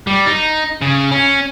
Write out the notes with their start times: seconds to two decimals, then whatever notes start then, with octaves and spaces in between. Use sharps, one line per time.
0.07 G3
0.26 D#4
0.82 C#3
1.11 C#4